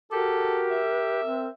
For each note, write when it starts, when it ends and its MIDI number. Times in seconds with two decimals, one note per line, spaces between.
0.11 0.83 66
0.11 1.21 67
0.11 0.62 69
0.11 1.48 70
0.71 1.52 76
1.24 1.48 60